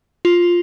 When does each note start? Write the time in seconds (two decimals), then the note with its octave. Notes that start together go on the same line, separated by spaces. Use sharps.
0.25 F4